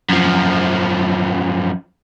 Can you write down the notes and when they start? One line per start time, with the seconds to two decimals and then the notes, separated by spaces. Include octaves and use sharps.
0.09 F#2 F3